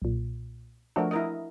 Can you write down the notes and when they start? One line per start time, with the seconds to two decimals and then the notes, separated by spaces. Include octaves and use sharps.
0.02 B1 A#2
0.96 F3 A3 D4 F#4 A#4
1.11 E4 A#4 D#5